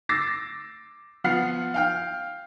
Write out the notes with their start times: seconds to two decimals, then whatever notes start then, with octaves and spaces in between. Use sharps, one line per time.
0.09 D6 E6 A6 A#6 C7
1.24 F3 B3 F#5 F6 C7
1.74 F5 G5 F6